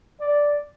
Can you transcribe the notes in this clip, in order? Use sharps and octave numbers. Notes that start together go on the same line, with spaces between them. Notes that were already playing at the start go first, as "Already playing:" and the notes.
D5